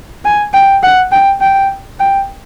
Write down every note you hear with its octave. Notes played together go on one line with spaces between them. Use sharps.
G#5
G5
F#5
G5
G5
G5